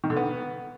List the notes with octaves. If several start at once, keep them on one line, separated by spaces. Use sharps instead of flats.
D#3
D3
B3